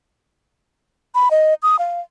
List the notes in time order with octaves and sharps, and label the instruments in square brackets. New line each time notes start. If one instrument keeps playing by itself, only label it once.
[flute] B5
D#5
D#6
F5